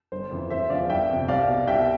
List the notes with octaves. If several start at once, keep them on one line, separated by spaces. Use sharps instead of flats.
G1 C5
F2 E3
E1 C5 E5
E2 D3 F3 D5 F5
G1 E5 G5
F2 C3
C2 D5 F5
B2
C2 E5 G5